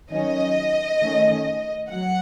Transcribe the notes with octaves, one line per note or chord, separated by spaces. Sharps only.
D#3 F#3 C#4 D#5
D#3 A3 C#4
F#3 F#5